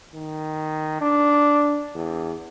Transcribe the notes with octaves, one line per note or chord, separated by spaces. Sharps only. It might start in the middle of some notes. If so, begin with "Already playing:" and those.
D#3
D4
E2